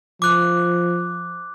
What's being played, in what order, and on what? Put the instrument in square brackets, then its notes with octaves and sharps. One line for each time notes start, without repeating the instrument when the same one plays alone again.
[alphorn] F3 [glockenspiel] D6 F#6